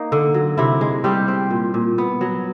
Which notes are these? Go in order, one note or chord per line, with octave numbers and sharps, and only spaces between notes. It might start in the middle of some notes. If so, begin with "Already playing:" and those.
Already playing: A#3 D#4
D3
F#3
C3 E4
G#3
G3 C4 G4
C4
A#2
A#2
B3
F#3